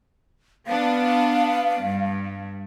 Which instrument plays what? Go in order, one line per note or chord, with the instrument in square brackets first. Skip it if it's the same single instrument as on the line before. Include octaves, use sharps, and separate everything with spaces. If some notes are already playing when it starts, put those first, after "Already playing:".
[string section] B3 D4 [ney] F5
[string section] G2